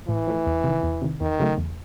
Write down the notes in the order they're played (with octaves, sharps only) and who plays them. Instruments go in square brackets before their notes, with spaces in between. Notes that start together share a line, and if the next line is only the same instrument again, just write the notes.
[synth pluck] A2 [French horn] E3
[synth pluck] F3 A3
E2
C3 D#3
E2
C3 D#3
[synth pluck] E2 [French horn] D#3
[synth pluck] C#3 F#3 A3
E2